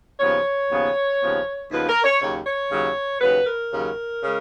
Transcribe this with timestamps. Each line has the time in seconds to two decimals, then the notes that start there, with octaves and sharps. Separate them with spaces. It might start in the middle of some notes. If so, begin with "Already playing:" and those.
0.20 D#2 C#3 F3 B3 C#5
0.70 D#2 C#3 F3 B3
1.20 D#2 C#3 F3 B3
1.71 D#2 C#3 F3 B3 B4
1.88 A#4
2.04 C#5
2.20 D#2 C#3 F#3 C#5
2.46 C#5
2.70 D#2 C#3 F#3
3.20 D#2 C#3 F#3 B4
3.46 A#4
3.72 D#2 C#3 F#3
4.22 C#3 G#3